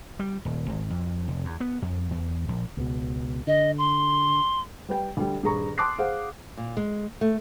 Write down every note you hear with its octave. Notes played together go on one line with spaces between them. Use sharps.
G3
D#1
G#1
F2
F1
E2
B3
F2
E2
A#1
C#2 B2
D3 D#5
C6
G3 B4 G5
D2 G3
D#1 G2 G#4 A#5 C#6
A5 C6 D6 D#6 F#6 C7
G#4 C5 F5 F#5
A#2
G#3
A3